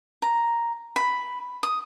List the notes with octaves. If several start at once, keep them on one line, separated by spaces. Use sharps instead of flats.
A#5
B5
D#6